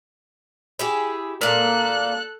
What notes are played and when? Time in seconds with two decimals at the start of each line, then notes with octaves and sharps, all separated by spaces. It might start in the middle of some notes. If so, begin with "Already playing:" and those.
0.79 E4 G4 G#4
1.41 A#2 A#3 A4 F#6